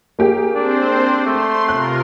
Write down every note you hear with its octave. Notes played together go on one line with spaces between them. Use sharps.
A#3 G4 G#4
C4 D4 C5
A3 C6
C3 F4 A#4 F#6